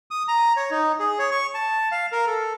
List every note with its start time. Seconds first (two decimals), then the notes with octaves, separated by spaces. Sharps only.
0.11 D#6
0.28 A#5
0.57 C#5
0.71 D#4
1.00 G#4
1.19 C#5
1.31 C#6
1.54 A5
1.92 F5
2.12 A#4
2.27 A4